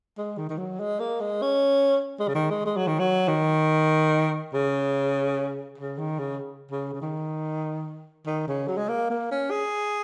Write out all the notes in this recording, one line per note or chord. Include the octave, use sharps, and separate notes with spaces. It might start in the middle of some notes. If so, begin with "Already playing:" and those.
G#3
D#3
D#3
F#3
G#3
A#3
G#3
C#4
G#3
C#3
D#3
G#3
G#3
F#3
D#3
F#3
D#3
C#3
C#3
D#3
C#3
C#3
C#3
D#3
D#3
C#3
F#3
G#3
A#3
A#3
C#4
G#4